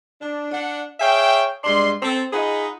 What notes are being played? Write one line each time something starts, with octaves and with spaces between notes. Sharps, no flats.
D4
D4 F#5
G#4 C#5 E5 F5 G5
G2 G#3 D5 C6
C4 A4
D#4 F4 G#4 D#5 F#5 B5